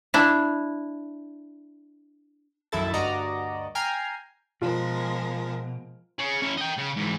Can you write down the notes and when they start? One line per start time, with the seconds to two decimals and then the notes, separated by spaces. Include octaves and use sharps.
0.14 D4 E4
2.72 A#1 F#2 D#3 E4 A4 A6
2.94 D2 G2 F#4 D5 D#5 A#5
3.75 G5 G#5 A#5 F6 G#6 C7
4.62 B2 F3 G#3 F4 A#4
6.19 G#4 C#5
6.42 C#4 E4
6.58 D#5 G5
6.78 C#3
6.96 G#2 E3